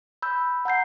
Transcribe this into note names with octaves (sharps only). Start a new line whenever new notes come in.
B5 E6 G6
F#5 A#5 G6 C7